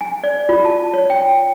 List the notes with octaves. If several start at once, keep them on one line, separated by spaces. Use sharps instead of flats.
G#5
D5
F4
A5
C#5
G5